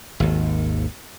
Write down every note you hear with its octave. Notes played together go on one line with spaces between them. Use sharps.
G#1 D#2